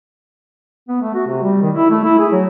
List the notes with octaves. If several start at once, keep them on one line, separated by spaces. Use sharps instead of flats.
B3
A3
F#4
C3
G3
D#3
E4
A3
E4
G#4
F#3